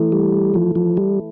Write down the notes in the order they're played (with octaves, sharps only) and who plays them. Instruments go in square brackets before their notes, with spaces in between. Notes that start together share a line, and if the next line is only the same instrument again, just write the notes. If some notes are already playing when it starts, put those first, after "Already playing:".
Already playing: [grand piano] E3 A3 E4
[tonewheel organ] G3
F3
F3
G3